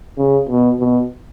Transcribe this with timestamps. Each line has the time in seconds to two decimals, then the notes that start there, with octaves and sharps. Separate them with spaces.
0.18 C#3
0.49 B2
0.80 B2